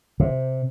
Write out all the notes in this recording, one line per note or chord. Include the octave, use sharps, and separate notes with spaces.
C3